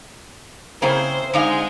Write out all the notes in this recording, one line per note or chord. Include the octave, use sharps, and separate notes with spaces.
C#3 A#3 C4 E4 G#4 C5
D3 G#3 D#4 F5